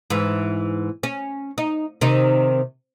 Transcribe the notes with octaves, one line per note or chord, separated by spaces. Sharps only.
G#2 E3
C#4
D#4
C3 D#3 D#4